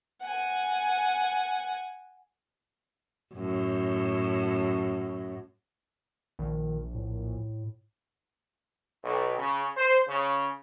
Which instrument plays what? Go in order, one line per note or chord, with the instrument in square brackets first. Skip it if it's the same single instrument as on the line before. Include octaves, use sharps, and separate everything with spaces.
[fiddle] F#5 G#5
[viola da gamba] F#2 A2
[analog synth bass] A#1 [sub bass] D#3
[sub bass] A2
[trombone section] B1
C#3
C5
C#3